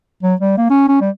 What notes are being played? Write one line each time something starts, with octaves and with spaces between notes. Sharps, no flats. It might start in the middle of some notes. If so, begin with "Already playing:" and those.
F#3
G3
A#3
C#4
C#4
G3